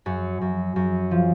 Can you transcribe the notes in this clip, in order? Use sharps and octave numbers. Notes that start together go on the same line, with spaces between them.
F#2
F#2
F#2
F3